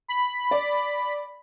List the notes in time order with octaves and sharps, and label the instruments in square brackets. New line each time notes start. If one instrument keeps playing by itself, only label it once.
[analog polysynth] B5
[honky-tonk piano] D5